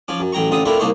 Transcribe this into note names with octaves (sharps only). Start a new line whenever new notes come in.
F3 C#4 D6
F#2
A1 F#3 G5 A#5 C#6
A1 D3 C4 F4 D#6
A3 C4 D4 E4 F4 A#4
C2 A#3 D4 D#4 C5 C#6